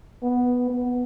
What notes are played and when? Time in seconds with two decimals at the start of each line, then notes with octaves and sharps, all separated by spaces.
0.23 B3
0.70 B3